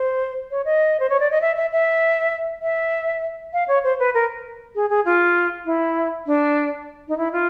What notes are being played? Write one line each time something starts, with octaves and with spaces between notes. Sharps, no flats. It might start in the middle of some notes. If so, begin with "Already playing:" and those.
Already playing: C5
C#5
D#5
C5
C#5
D5
D#5
E5
E5
E5
E5
F5
C#5
C5
B4
A#4
G#4
G#4
F4
E4
D4
D#4
E4
F4